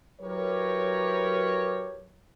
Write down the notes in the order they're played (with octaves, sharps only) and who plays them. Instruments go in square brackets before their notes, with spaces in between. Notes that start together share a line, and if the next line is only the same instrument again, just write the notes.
[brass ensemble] F#3 E4 G4 A#4 B4 C#5